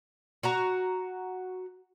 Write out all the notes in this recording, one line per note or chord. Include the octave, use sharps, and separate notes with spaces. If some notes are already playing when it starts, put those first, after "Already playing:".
F#4 F#5 A#5